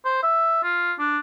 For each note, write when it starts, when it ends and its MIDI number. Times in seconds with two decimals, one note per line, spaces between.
0.05 0.22 72
0.23 0.62 76
0.63 0.93 65
0.99 1.18 62